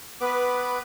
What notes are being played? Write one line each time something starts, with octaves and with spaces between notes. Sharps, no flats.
B3 B4 D6